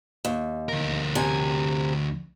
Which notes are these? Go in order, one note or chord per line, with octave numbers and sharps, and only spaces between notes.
D#2
D2 A#4
C3 G#5